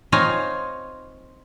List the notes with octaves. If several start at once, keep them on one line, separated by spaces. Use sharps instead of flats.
C4 D#4 F4 C#5 F5 G#5